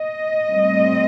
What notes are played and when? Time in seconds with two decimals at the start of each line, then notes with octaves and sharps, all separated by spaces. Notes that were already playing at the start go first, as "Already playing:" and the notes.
Already playing: D#5
0.50 A2 G3 C4